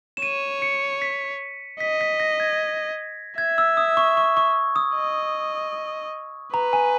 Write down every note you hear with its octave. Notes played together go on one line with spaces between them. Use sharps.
E7
C#5 D#7
C#7
B6
D#5 B6
B6
A#6
G#6
E5 G#6
E6
D#6
C#6
C#6
C#6
D#6
D#5
B4 A#5
G#5